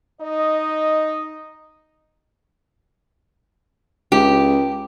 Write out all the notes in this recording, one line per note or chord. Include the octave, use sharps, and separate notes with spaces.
D#4 D#5
C#2 G4